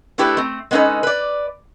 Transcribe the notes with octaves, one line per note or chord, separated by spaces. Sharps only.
A3 D4 E4 G4 A4 B4
A3 C4
G#3 B3 C#4 D#4 A4 B4
B4 D5